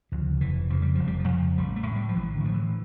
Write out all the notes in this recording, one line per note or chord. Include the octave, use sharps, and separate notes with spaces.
D2 C#3 F3
F1 E3
F2 C#3 F3
G3
F1 F3
G3
F3
F2 C#3
A1 G3
A3
A2
G3
F3
A1 E3
D3
A2 F3
E3